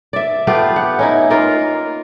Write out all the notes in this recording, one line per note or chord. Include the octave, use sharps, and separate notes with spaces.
D5 E5
A3 B3 F4 G4
F#5
C#4 D#4 E4
A#3 D#4 F4 A#4